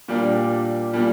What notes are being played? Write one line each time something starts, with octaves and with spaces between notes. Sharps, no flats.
A#2 G3 A#3 D4
A#2 G3 A#3 D4